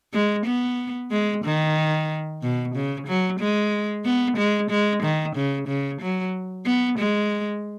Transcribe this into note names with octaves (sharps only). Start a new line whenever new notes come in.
G#3
B3
G#3
D#3
B2
C#3
F#3
G#3
B3
G#3
G#3
D#3
C#3
C#3
F#3
B3
G#3